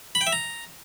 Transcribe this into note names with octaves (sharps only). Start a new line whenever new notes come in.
B5
G5
E5
A#5